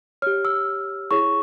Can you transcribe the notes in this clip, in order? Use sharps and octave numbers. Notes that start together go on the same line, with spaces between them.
G4 C#5 F6
E6
E4 G#4 C#5 C#6